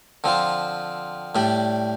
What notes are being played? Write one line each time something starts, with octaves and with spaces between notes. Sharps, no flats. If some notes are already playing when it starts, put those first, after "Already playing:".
D3 F3 C4 F4
A2 G3 D4 G4